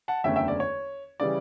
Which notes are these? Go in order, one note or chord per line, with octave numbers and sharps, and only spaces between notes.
F#5 A5
F#1 E2 D3 A3 C#4 E5 G5
E5 G5
D5
C#5
C#3 E3 G3 D5